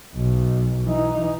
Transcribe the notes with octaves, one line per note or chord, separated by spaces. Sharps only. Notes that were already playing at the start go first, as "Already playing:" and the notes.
B1
E3 D#4